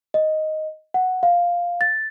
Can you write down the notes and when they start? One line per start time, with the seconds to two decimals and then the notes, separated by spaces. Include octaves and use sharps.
0.14 D#5
0.94 F#5
1.23 F5
1.81 A6